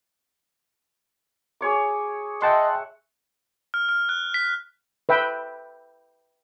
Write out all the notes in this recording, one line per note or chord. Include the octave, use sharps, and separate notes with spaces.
G#4 C#5 D6
D#5 E5 F#5 G5 A5 C6
F6
F6
F#6
B6
B4 E5 G5